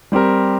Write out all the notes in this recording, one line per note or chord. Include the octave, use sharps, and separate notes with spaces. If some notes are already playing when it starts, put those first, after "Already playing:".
G3 C4 G4 A#4